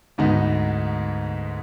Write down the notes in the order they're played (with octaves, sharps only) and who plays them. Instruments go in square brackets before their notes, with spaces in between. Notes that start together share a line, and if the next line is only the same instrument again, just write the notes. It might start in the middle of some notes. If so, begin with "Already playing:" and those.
[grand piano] D2 G#2 B3 D#4